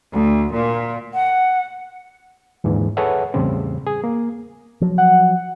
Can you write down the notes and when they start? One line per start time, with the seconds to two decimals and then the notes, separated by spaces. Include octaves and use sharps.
0.12 D2
0.53 A#2
1.14 F#5
2.64 D#2 G#2 D3 E3
2.97 G#4 A4 B4 C#5 E5 F#5
3.34 E2 A2 C#3 G3 C4
3.86 G#4
4.04 A#3
4.81 F3 F#3
4.98 F#5